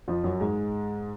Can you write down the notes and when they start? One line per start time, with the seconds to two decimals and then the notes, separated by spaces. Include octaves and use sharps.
0.08 F2 F3
0.23 F#2 F#3
0.40 G#2 G#3